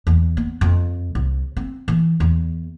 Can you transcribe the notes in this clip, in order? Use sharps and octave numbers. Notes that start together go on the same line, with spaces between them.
E2
B3
F2
C2
C4
E3
E2